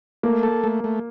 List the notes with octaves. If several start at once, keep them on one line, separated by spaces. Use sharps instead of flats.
A3 A#3
A4
A3
A3